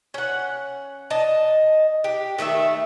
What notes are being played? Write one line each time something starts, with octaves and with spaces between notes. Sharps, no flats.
C#4 F#5
D#5 A5
G4
D#3 A3 D#5 E5